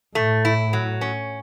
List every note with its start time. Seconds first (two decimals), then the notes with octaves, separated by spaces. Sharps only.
0.15 A2 A3
0.45 E4
0.73 F#3
1.01 C#4